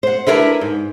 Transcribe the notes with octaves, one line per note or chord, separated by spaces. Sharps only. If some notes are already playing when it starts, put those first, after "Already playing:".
C5 F#5
D4 E4 F4 A#4 B4 E5
G#2